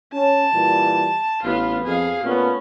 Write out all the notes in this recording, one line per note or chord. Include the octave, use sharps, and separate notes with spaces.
C#4 A5
A#2 E3 G3
A1 B3 F4
F2 G#4 F5
A#2 A3 B3 C#4